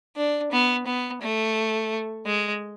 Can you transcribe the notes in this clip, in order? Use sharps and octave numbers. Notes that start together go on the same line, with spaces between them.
D4
B3
B3
A3
G#3